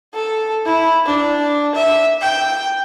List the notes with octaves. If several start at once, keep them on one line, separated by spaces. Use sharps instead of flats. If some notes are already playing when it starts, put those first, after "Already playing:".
A4
E4
D4
E5
G5